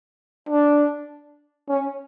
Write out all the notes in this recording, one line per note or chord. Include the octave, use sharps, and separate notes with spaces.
D4
C#4